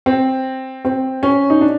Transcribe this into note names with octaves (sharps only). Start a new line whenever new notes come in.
C4
C4
C#4
D#4
D4